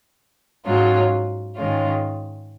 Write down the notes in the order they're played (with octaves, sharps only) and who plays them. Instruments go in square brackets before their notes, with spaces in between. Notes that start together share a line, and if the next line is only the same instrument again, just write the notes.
[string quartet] G#2 F#3 C#4 F4
G#2 D#3 G#3 C#4 F4